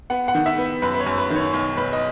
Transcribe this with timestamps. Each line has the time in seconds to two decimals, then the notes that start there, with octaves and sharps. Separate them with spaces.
0.10 B3 F#5
0.28 F#5
0.35 D#3
0.46 E5
0.58 B3
0.82 F#2 B4
0.95 B4
1.00 C#5
1.06 F#2
1.18 B4
1.30 D#3
1.36 C#5
1.53 B1 C#5
1.77 B1 B4
1.93 D#5